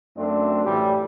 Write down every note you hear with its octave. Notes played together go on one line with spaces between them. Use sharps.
F#2 A3 C4 D4
A2 E3 G3